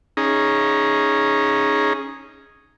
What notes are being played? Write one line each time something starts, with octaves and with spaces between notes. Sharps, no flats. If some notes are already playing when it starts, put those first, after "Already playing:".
C#4 D#4 G#4 A#5